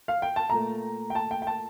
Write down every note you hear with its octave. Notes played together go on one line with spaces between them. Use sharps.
F5
G5
A5
A#2 A3 A#5
G5
A5
G5
G5
A5